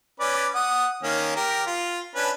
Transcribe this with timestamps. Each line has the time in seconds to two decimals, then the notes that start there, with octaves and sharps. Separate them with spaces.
0.20 C#4 B4 D5
0.55 F#5 D#6
1.03 D#3 A#3 C#4
1.36 G4 A#4
1.67 F4
2.16 C#4 D4 B4